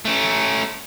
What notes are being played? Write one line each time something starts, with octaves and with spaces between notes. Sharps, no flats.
A3 C#4